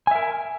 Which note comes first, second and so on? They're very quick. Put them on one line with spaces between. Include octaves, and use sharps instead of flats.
G#5 E5 A#4